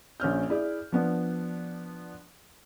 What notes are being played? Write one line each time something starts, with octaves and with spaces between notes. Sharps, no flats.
A#1 C#4 F6 G6
E4 G#4 D5
F3 B3 D4